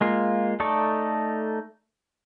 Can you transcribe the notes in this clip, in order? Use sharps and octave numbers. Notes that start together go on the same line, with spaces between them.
G#3 A#3 F4
A3 D#4 A4 D5 C#6